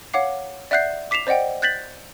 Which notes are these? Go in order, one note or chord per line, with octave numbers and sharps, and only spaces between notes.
C#5 F5 F#5 D6 C7
D5 E5 F#5 F#6 G6 C7
D6 B6 C7 E7 F7
C5 D5 D#5 F#5 G5
F#6 G6 A6 B6 F#7